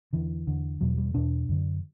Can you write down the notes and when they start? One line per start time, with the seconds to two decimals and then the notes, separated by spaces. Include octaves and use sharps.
0.13 E2 D3 E3
0.47 E2 D3
0.81 E2 B2 F#3
0.98 G3
1.14 E2 B2 D4
1.49 F#2 D3